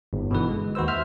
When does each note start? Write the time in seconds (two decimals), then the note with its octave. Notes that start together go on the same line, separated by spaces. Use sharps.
0.13 G1
0.31 B2 D3 E3 B4
0.49 G#3
0.75 D#2 F#4 B4 C5 E6
0.88 C5 E5 F6